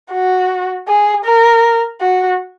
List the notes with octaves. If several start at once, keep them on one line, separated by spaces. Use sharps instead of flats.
F#4
G#4
A#4
F#4